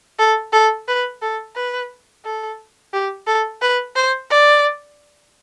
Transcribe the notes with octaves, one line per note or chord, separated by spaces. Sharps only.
A4
A4
B4
A4
B4
A4
G4
A4
B4
C5
D5